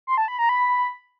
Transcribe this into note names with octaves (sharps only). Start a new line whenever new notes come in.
C6
A5
B5
A#5
B5